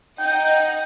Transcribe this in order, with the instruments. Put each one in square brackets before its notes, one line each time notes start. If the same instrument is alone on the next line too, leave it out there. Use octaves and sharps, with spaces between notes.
[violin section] D#4 D#5 F#5 [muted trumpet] G5